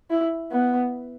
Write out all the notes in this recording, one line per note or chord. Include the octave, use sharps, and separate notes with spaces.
E4
B3